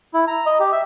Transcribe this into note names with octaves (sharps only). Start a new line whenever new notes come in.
E4
A#5
D#5
G4
E5